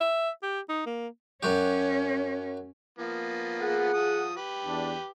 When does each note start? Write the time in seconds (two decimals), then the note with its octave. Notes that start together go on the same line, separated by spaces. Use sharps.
0.01 E5
0.43 G4
0.69 D#4
0.86 A#3
1.43 F#2 F#3 C#4 G4
2.99 F3 A#3 B3
3.61 G#4 F#5
3.93 F3 D#6
4.36 G4 B4
4.65 E2 D4